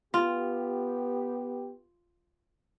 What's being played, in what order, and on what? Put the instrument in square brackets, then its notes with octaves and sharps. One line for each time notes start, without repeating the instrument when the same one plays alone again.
[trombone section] B3 G4 [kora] F4